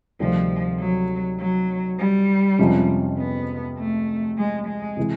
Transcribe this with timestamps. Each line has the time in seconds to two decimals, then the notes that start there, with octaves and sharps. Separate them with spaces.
0.20 D2 C3 D#3 F3 G3 C4
0.79 F#3
1.39 F#3
1.99 G3
2.59 F2 C3 F3 G#3 C#4
3.18 B3
3.78 A3
4.38 G#3
4.68 G#3
4.97 C3 E3 G#3